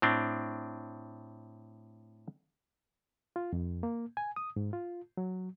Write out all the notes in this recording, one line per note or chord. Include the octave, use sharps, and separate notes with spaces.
A2 C4 D4
F4
F2
A#3
G#5
D#6
G#2
F4
F#3